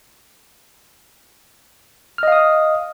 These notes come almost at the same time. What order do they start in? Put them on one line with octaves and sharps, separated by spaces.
F6 D#5 F5 D#6